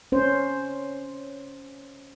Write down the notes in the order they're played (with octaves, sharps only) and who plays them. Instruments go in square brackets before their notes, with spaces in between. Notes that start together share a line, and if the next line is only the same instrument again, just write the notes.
[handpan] C#4 C5